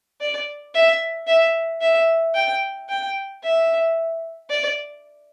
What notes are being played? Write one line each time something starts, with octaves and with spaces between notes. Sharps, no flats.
D5
E5
E5
E5
G5
G5
E5
D5